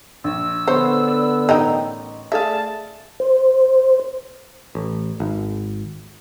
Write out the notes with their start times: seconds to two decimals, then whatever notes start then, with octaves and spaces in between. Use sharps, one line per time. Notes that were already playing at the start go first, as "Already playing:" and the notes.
0.24 A#1 E6
0.68 D3 B3 C5 C#5
1.08 D5
1.49 A1 D#3 D#4 G5
2.32 A3 G#4 D5 E5 F5 A5
3.20 C5
4.75 A1
5.20 G#1